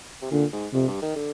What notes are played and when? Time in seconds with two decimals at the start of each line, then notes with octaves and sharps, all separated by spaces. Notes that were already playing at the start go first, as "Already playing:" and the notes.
0.22 C3
0.31 A#2 D3
0.52 G#2
0.73 F2 C3
0.88 G2
1.02 D#3
1.16 D3